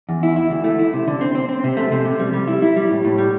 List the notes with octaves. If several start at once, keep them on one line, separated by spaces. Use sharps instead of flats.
E2
E4
E4
D2
A3
E4
C3
D3
C4
C4
C4
C3
A3
C3
C3
G3
G3
E4
E4
G3
A2
A2
G3